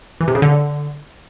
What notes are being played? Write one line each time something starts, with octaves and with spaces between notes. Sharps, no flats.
E3
C3
C#3
D3